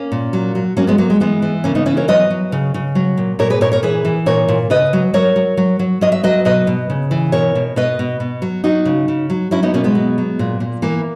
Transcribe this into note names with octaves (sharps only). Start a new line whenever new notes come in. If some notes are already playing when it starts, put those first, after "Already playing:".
Already playing: A#3 C#4
A#2
F#3
F#3
F#3 A#3 C#4
G#3 B3
F#3 A#3
G#3
E3 G#3 B3
E3
C#3 A#3 C#4
B3 D#4
E3 C#4 E4
A#4 C#5
F#3 B4 D#5
F#3
C#3
C#3
F#3
A#2
A#2 A#4 C#5
G#4 B4
A#2 A#4 C#5
A#4 C#5
E3 G#4 B4
E3
A#2 A#4 C#5
A#2
C#3 B4 D#5
F#3
F#3 A#4 C#5
F#3
F#3
F#3
F#3 D#5
E5
F#3 B4 D#5
B2 B4 D#5
B2
C#3
E3
B2 A#4 C#5
B2
B2 B4 D#5
B2
B2
F#3
F#3 D#4 F#4
C#3
C#3
F#3
F#3 C#4 E4
B3 D#4
B2 A#3 C#4
G#3 B3
F#3
F#3
A#2
A#2
E3 A#3